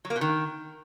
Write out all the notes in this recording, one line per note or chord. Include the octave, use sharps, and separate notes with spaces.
F#3
A#3
B2
D#3